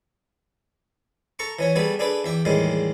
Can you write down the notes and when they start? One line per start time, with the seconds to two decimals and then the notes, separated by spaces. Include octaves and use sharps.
1.39 A4 A#5 C#6
1.59 E3 C#4 C#5
1.76 G3 B3 F#4 G#4 A4
1.99 D4 G#4 A4 B4 D5
2.24 E2 E5 G5 D6
2.45 E2 A2 D#3 G3 G#3